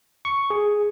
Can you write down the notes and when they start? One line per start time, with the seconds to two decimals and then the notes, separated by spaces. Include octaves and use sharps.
0.25 C#6
0.50 G#4